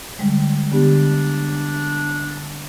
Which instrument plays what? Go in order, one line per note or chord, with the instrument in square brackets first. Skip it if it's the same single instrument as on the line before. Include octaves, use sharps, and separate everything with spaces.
[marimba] D3 G3 G#3
[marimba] D3 B3 G4 [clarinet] D4